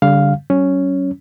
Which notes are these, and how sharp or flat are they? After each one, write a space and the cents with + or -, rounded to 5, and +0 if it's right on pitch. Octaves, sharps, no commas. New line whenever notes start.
D3 -40 G3 +0 F5 +0
F#3 +40 C#4 +0